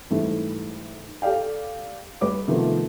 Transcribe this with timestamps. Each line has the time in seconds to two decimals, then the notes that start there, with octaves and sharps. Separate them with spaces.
0.10 G#2 E3 G3 A3
1.22 G4 A4 D5 F5 G5
2.21 G3 B4 C#5 D6
2.48 C3 D#3 F3 A3 B3